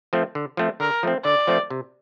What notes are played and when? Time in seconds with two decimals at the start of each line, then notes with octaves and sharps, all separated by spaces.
0.13 F3 A3 C4
0.35 D3
0.57 F3 A3 C4
0.80 D3 A#4
1.03 F3 A3 C4
1.25 D3 D5
1.47 F3 A3 C4
1.70 C3